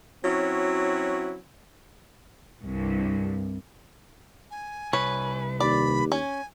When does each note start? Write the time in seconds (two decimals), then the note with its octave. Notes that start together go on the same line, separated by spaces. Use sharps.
0.24 F#3 C4 C#4 E4 F#4
2.63 C2 G2
4.51 G#5
4.93 C2 B4 C#5
5.60 D#2 D5 B5
6.12 C#4 G#5